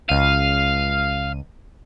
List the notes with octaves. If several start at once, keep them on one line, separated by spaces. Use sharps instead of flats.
C#2 F5 D#7